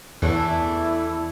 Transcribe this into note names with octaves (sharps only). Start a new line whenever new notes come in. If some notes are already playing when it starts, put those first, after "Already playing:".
E2 E3 A3 D4 E4